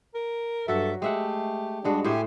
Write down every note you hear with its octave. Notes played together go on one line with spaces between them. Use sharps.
A#4
G2 F#3 F#4 A4 E5
G#3 A3 G4 E5 F#5
G2 G3 G#3 D4 F#4
A2 A3 G4 C5 G#5